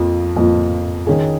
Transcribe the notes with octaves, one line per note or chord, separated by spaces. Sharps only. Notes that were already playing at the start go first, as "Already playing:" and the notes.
Already playing: F2 F3 A#3 F4
F2 F3 A#3 F4
D#3 C#4 G#4